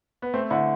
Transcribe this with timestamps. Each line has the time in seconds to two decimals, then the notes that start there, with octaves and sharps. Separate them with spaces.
0.22 B3
0.34 A3 C4
0.50 D3 E4